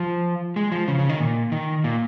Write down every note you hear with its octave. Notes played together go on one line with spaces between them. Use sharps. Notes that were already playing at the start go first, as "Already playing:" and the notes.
Already playing: F3
G#3
F3
C#3
C#3
D#3
A#2
D#3
A#2